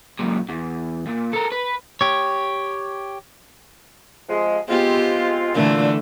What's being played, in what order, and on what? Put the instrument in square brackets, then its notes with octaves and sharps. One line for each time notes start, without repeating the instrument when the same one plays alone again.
[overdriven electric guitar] F#2 A#2
E2
A#2
A4 A#4
B4
[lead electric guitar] G4 C#5
[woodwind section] C3 F3 G#3
[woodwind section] G#3 C4 F4 [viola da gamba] B3 G4
[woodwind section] A#2 [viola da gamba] D3 E3 A3